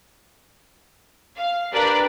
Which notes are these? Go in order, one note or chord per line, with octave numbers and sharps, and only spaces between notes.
F5
D4 G4 A#4 B4 D5 B5